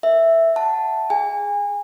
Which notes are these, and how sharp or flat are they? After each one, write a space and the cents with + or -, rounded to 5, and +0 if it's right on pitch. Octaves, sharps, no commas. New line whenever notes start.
A#4 +0 E5 +0
F#5 +0 A5 +0
G#4 +0 G#5 -30